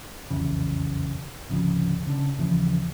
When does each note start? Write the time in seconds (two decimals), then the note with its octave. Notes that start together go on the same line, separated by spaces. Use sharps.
0.30 F1 B1 E2 C#3
1.49 G#1 D2 C#3 F3
2.07 C#3 D4
2.39 D#2 C#3 E3 F3